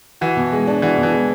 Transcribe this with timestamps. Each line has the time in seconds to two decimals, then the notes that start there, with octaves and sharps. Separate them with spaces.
0.21 E3 F#4
0.37 B2
0.52 G#3
0.67 D4
0.82 E3 F#4
0.98 B2
1.03 E3
1.13 G#3